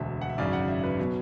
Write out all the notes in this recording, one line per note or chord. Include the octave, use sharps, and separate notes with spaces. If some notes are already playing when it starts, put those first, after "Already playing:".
Already playing: E1 D2 D3 E5
F#5
E5
G#1 F#2 C#3 D5
F#5
E5
B4
B2 F#3